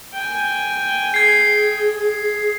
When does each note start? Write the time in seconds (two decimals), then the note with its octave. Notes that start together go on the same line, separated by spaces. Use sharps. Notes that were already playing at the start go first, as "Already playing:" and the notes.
0.14 G5 G#5
1.14 G#4 G#6 C7